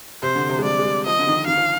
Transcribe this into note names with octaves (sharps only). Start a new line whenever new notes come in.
C3 C5
D3
C3
G#3
G3 D5
G#3
G3
F3 D#5
D3
D#3
D#3 F5
F3